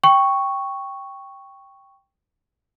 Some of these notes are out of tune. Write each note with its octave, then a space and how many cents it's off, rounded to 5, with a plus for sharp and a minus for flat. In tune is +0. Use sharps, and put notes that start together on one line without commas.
G5 +0 C#6 +0